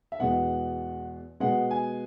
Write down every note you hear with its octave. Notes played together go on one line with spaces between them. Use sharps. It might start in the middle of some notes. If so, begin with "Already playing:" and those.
E5
E2 B2 G#3 B3 F#5
B2 G#3 B3 F#5
G#5